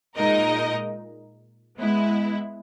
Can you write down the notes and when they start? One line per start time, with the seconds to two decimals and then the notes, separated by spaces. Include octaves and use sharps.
0.15 A#2 G#3 D#4 A#4 D#5
1.78 G#3 B3 E4